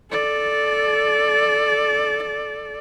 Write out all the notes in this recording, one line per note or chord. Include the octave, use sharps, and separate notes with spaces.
A4 D5